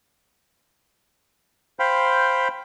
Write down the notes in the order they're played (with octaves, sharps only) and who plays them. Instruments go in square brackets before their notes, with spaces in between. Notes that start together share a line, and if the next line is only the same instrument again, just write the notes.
[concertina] C5 F5 G5 B5